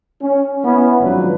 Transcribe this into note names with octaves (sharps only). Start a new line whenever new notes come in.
C#4
B3 C#4 E4 B4
G#1 A2 F3 F#3 D4 B4